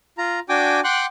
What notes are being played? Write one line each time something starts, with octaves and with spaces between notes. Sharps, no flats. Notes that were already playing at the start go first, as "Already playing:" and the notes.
F4 A#5
D4 F#4 G5 G#5 D6
F#5 G5 C6 D6 F#6